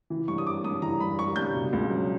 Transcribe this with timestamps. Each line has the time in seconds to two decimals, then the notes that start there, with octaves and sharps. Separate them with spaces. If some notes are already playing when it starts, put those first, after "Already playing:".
0.10 E3
0.28 G2 C#6
0.38 D#6
0.47 G3 D6
0.64 G2 D#6
0.82 E3 A#5
1.01 G2 B5
1.18 G3 C#6
1.36 G2 G6
1.54 B2
1.73 C#2
1.91 F#3